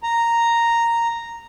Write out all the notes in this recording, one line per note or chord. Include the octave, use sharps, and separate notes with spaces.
A#5